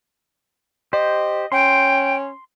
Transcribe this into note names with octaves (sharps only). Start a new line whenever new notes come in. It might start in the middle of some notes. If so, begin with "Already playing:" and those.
G4 C5 D#5
C#4 G5 C6